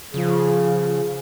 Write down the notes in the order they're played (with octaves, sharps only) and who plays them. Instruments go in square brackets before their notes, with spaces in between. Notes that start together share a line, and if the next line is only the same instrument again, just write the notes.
[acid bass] C#3 [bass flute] F3 [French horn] G#4